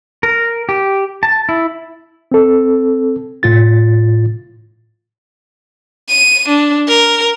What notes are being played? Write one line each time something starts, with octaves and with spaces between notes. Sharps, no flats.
A#4
G4
A5
E4
C4 A4
A2 F4 A6
D#7
D4
A#4